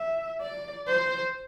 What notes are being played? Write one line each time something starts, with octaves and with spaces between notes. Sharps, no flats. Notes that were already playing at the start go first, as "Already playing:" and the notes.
Already playing: E5
D5
C5